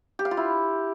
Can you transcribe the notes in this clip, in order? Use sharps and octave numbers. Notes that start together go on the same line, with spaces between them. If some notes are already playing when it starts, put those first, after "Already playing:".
G4
F5
F4
E4